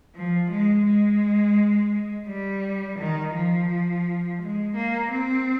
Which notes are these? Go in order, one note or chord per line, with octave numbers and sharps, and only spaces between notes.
F3
G#3
G#3
G3
D#3
F3
G#3
A#3
C4